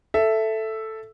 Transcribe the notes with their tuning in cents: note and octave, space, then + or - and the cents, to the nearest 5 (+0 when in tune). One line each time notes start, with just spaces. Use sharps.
A4 +0 E5 +5